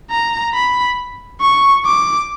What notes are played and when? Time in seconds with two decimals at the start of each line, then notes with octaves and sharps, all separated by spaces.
0.11 A#5
0.54 B5
1.41 C#6
1.85 D6